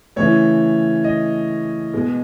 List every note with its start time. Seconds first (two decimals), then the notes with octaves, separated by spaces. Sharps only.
0.16 C#3 E3 A3 C#5
1.04 D#5
1.93 B2 G#3